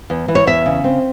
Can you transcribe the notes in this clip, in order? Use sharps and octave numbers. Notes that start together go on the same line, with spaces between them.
E2
E3
C#5
E2 E5
C#3
C4